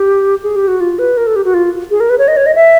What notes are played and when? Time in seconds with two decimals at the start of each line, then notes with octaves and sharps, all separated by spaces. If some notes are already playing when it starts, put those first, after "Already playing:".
Already playing: G4
0.43 G#4
0.56 G4
0.68 F#4
0.80 F4
0.99 B4
1.17 A#4
1.27 A4
1.36 G4
1.45 F#4
1.54 F4
1.91 G#4
2.00 A#4
2.10 B4
2.18 C#5
2.28 D#5
2.37 C#5
2.46 D#5
2.55 E5